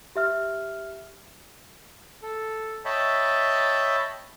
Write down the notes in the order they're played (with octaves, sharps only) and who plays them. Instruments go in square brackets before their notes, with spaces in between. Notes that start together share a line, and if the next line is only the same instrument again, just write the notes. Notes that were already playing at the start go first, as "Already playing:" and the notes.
[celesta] G4 E5 F6
[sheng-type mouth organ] A4
C#5 D#5 E5 G5 A5 B5